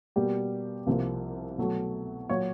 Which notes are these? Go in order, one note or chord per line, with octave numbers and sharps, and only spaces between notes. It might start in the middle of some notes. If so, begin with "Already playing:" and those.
B2 G3 A#3 G4
C2 C3 F3 A#3
B2 F#3 A3
A#2 F#3 C#5